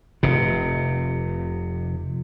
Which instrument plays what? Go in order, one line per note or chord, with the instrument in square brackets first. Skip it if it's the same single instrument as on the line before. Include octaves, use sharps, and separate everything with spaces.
[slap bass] F1 C3